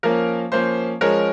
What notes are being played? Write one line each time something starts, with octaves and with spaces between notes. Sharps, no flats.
F3 A#3 C#4 A#4
F3 A#3 C#4 C5
F3 G#3 C#4 A#4 C#5